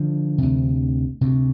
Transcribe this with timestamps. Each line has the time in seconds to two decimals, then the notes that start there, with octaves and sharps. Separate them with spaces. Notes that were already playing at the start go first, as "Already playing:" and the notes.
Already playing: D3 F3
0.38 D2 C3
1.21 D2 C3